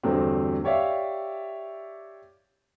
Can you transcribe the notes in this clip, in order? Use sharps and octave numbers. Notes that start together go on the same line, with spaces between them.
E2 G2 D3 F#3 A3 C4
G4 C#5 D5 E5 F5